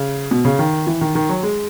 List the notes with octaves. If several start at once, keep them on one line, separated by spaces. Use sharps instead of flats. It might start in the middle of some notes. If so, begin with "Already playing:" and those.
Already playing: C#3
B2
C#3
D#3
E3
D#3
D#3
F#3
G#3